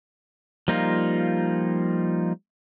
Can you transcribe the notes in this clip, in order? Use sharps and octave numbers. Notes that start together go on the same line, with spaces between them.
F3 G3 A#3 D#4 F4